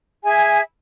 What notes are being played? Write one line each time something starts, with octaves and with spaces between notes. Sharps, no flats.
G#4 E5 G#5